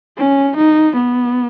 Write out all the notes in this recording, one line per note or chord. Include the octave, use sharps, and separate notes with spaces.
C#4
D#4
B3